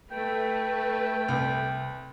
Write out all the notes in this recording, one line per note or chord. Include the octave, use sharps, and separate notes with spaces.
A3 B4 G5
C2